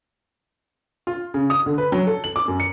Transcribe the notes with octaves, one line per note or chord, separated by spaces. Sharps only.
F4
C#3
D#6
D3
B4
F#3
A4
F#7
D6
F#2
C#7